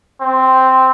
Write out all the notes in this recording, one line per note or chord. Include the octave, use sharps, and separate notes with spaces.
C4